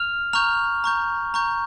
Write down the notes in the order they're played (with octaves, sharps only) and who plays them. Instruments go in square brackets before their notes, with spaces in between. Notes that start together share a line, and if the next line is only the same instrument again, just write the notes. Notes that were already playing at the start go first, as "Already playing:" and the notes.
Already playing: [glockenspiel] F6 F7
A#5 C#6 F6 G6 F7
A#5 C#6 G6
A#5 C#6 G6